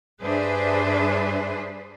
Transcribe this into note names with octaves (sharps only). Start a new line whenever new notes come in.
G2 D4 G#4 B4 C5 E5